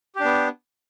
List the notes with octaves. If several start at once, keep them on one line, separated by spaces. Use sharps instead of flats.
B3 D4 G4